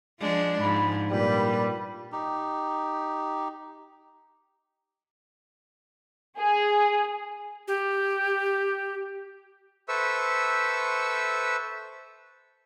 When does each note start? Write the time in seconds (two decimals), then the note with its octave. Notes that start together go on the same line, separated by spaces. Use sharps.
0.21 F3 G#3 D4
0.61 G#2 F3 B5
1.12 A#2 G3 B4
2.12 D#4 G4
6.38 G#4
7.68 G4
9.89 A4 B4 C5 E5 C#6 E6